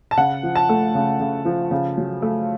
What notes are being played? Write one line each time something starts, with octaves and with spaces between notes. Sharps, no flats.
A5
C#3 F#5
F3
A5
A3
C#3
C#3
F3
C#3
F#3
A3